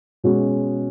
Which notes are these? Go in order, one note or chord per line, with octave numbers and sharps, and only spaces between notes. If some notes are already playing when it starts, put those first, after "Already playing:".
B2 G#3 C#4 F#4